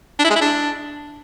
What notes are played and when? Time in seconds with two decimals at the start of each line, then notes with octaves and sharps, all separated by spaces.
0.19 D4
0.25 E4
0.30 G#3
0.36 E4
0.41 D4